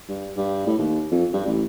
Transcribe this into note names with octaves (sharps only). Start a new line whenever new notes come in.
G2
G2
A2
D#2
F2
G2
A1